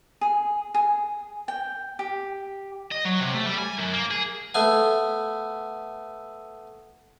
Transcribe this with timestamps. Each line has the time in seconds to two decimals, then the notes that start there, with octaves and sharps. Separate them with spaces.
0.21 G#4
0.74 G#4
1.48 G5
1.99 G4
2.92 D#5
3.05 F#3
3.20 C3
3.34 A3
3.46 G3
3.58 G#5
3.79 F#2
3.93 A#3
4.11 G#4
4.54 A3 B3 G#5